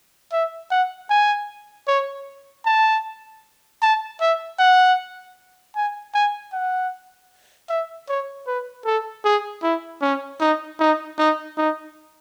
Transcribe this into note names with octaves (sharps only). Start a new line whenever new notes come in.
E5
F#5
G#5
C#5
A5
A5
E5
F#5
G#5
G#5
F#5
E5
C#5
B4
A4
G#4
E4
C#4
D#4
D#4
D#4
D#4